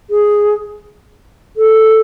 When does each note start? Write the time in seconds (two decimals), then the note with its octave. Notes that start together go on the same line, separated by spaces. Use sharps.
0.10 G#4
1.57 A4